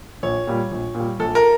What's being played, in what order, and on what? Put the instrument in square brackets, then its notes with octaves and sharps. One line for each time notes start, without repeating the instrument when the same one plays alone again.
[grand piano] A#1 [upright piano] C#5
[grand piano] A#2 G3
A#1
A#2 G3
[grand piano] A#1 [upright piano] A4
[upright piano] A#4